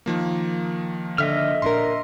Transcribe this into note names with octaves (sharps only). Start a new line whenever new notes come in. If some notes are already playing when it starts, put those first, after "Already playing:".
D#3 F3 A#3
D3 D#5 E5 F6
A#2 D4 A#4 C6